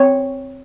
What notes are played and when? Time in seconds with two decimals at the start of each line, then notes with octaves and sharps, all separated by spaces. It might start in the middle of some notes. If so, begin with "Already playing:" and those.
Already playing: C4 C#5